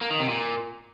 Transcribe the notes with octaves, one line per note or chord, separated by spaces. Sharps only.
A#3
D#3
C3
A#2